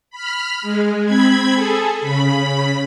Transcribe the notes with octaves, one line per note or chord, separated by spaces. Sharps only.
B5 F6
G#3
C4 B5 G#6
G#4 A4
C#3 B5